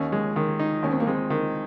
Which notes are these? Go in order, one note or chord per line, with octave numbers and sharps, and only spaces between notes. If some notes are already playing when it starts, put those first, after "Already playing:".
Already playing: D#2 C#4
G#3
D#3
D#4
D#2 C#4
C4
A#3
G#3 C4
D#3